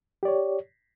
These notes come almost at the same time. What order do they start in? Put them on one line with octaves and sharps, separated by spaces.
G4 D5 C#5